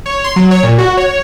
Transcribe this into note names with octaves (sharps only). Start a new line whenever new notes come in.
C#5
C6
F#3
C#5
A#2
F#4
C#5